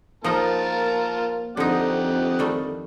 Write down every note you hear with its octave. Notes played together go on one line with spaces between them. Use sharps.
F3 A#3 D#4 F4 A#4 D#5 A5
F2 D3 C4 D#4 G4 D#5 F#5
D#3 G3 A3